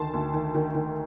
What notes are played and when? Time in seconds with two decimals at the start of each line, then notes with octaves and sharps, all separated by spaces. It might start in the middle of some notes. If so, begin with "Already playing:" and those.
Already playing: D2 D#3 A5 C6
0.14 D2
0.34 D#3
0.55 D#3
0.75 D#3